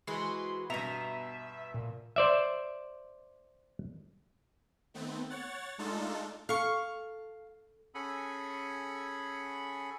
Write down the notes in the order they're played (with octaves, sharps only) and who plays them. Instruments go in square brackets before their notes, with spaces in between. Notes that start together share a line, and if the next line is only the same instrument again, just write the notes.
[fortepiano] E3 G#3 [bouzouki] F#4 B4 C5 [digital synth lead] C6
[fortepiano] G2 B2 [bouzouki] B3 A#5 [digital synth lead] E5
[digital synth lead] A#2
[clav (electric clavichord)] C5 D5 E5
[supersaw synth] D#3 A3 B3 C4
C#5 F#5 A6
G#3 A3 D4 D#4 F4 A4
[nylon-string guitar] A4 [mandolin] F5 C#6
[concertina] C#4 G#4 A4 F#5 G#5 B5